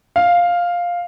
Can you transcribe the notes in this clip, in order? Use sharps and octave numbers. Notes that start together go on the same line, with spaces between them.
F5